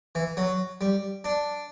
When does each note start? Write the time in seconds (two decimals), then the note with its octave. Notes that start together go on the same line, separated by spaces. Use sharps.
0.15 E3
0.37 F#3
0.81 G3
1.24 D4